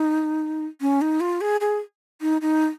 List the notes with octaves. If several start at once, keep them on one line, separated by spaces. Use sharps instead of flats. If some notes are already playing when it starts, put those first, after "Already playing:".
Already playing: D#4
C#4
D#4
F4
G#4
G#4
D#4
D#4